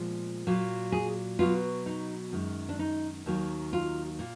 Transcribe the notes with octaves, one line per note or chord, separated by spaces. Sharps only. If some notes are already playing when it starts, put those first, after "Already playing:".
Already playing: A#2 F3 G#3 B3
A#2 F#3 A#3
G#4
B2 F#3 B3 F4
D#4
F#2 D#3 G#3
D4
D#4
D#2 D#3 F#3 A#3
F4
A#2